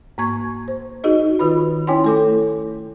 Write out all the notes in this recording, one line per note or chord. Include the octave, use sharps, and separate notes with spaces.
G#2 A#3 C#6 G#6
C5
D#4 F#4 G#4 D#5
D#3 F4 B4 B5
C#4 E4 C#5 G5 G#5 C6
A3 A4 D6